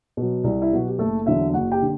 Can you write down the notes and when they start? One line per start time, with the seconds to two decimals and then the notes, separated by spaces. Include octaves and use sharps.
0.17 B2 F#3
0.44 C2
0.62 E4
0.71 B2 F#3 F#4
0.86 G4
0.99 F#1 A3 A4
1.26 E2 D3 F#3 E4 E5
1.53 F#1 F#4 F#5
1.71 G4 G5
1.82 D3